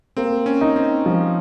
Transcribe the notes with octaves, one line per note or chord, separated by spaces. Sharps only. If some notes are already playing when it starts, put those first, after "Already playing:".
A#3 C4
C#4
D#4
C4
F3